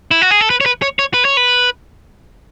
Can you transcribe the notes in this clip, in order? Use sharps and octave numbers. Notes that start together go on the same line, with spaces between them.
E4
F#4
G#4
A4
B4
C#5
B4
C#5
C#5
B4
C#5
B4